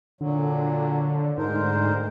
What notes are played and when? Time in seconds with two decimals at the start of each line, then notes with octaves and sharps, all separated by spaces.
0.21 A#2 D3 F#3
1.38 D2 G#2 A#4 C5